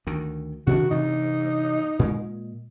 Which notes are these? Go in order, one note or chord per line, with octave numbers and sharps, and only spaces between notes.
D2 D#3
C3 D#3 D4 F#4
G2 C3 E3 D#4
A#2 G#3